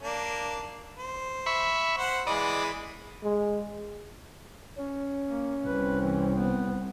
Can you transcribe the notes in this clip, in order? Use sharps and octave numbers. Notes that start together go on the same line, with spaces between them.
A#3 D4
C5
E5 B5 C#6
C5 F#5
E3 G#3 D5 D#5 B5
G#3
C#4
A#3
C2 C4 B4
E3
B3